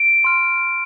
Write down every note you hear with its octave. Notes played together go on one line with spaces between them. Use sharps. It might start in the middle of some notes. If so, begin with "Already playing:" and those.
Already playing: D7
C6 F6